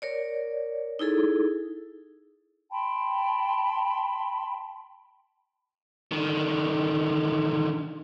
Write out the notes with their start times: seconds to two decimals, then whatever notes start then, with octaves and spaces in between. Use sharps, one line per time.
0.02 A#4 C#5 D5
0.99 D#4 E4 G#4 A4
2.71 G5 A5 B5 C6
6.12 D3 D#3